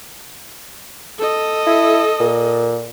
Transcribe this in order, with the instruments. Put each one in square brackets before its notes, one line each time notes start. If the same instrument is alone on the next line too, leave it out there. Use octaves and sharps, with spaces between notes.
[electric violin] A4 D#5
[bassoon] E4
A#2